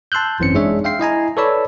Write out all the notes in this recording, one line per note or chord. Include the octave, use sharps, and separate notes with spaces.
A5 C6 E6 F#6 G6
G#1 F#2 E3 C4 C#4 C#7
G#3 D4 D#4 G#4 C#5 E5
E5 F5 G5 C6 C7
E4 D#5 G#5 A#5
A4 B4 C#5 D5 B5 E6